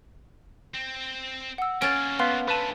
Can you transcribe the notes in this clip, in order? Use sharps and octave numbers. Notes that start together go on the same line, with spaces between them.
C4
F#5 E6
A#3 C#4 A4 A6 D7
B3 F5 C6 F6
D3 A3 B4 A5